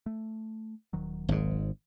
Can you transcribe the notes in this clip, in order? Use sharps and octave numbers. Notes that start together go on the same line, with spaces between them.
A3
D#1 D#3 F#3
G#1 G#2